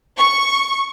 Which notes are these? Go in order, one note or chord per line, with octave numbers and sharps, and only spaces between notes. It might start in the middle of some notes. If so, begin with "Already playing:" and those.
C#6